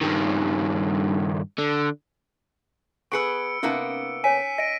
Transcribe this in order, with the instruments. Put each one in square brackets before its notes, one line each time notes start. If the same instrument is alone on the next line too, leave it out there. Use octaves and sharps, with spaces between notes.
[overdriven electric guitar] G2 D#3
D3
[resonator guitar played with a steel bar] B3 G#4 B4 [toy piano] C#6 [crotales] E6 C#7 D7
[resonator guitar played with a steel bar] C3 A#3 B3 [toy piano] C#4 D#4
[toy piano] C#5 G#5 [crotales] B6 D7 D#7
[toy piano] D#5 [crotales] A#6 D7